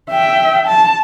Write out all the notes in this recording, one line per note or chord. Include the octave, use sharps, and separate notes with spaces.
E5 G5
A5